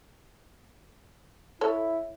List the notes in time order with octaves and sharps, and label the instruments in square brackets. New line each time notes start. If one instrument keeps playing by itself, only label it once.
[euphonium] E4 [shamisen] A4 C#5